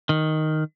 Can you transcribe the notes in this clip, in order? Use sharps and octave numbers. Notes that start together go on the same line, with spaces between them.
D#3